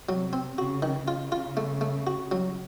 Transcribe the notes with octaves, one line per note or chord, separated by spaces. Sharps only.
C3 F#3
C4
C#3 F#4
D#3
C#3 F4
F4
A3
A3
F#4
F#3